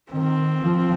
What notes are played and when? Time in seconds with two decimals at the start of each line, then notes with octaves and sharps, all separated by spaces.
0.11 D#3 C4
0.59 F3